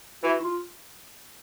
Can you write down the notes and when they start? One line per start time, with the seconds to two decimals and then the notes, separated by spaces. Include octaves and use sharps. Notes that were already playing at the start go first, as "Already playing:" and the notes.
0.23 E3 F#4
0.40 E4
0.44 F4